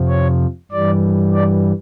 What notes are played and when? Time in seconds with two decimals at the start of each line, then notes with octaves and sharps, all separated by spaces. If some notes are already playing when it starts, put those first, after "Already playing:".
Already playing: F2 C3 F3
0.08 C#5
0.71 G2 E3 G3 D5
1.34 D5